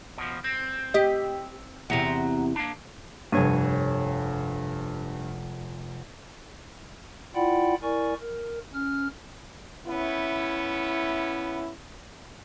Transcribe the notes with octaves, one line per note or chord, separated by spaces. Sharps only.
B2 F3
C4
G4 D#5
E2 C3 F#5 A#5
A#3 D4
F1 G2 C#5 D#7
E4 F4 D5 F#5 G5 B5
E4 A#4 D5 G#5 C#6
A#4
C#4 F6
B3 C#4 E4